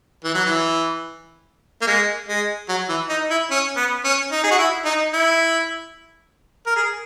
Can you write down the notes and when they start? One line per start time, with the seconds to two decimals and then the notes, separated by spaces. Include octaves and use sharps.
0.24 E3
0.34 F#3
0.45 E3
1.82 A#3
1.87 G#3
2.29 G#3
2.69 F#3
2.89 E3
3.09 D#4
3.30 E4
3.51 C#4
3.77 B3
4.04 C#4
4.31 D#4
4.43 G#4
4.51 F#4
4.58 E4
4.85 D#4
5.13 E4
6.66 A#4
6.76 G#4